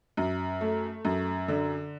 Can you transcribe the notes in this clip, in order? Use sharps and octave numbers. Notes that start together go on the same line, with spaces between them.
F#2
A3
F#2
D3